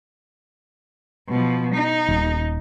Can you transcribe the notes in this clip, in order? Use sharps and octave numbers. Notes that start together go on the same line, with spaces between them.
B2 F3
D#4
D#1